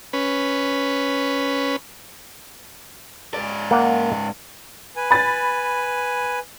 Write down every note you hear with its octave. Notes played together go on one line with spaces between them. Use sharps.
C#4 B4
G#2 D5
A#3 F#5
B4 G#5
B5 A6